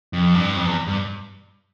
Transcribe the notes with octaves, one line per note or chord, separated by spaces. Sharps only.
F2
G2
F2
E2
G2